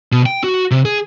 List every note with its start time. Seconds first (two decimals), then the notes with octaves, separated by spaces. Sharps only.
0.12 B2
0.26 G5
0.44 F#4
0.71 C3
0.85 G#4